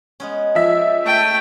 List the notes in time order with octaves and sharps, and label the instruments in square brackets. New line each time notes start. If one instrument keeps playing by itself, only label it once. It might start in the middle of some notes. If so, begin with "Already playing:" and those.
[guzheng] G#3 B3 C#4
[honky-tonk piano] F3 E5
[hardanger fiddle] A3 G5